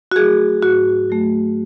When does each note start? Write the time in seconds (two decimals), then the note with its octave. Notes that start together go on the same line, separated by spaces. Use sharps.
0.12 F#4
0.15 F#3 A3 G#4
0.62 G#2 F#4
1.10 F#3 A3